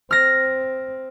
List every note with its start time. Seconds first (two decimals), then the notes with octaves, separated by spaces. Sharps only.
0.11 C4 F6 A#6